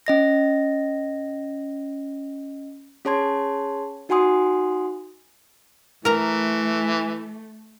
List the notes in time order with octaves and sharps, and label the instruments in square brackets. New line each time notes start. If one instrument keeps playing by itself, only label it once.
[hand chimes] C#4 D#5 A#6
C#4 G#4 C#5 A5 C6 G#6
D#4 F#4 F#5 G#5 C6 D#6
[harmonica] E3 [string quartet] A3 [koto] A#4 A#5